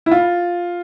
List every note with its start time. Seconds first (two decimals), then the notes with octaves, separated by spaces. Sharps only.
0.06 E4
0.11 F4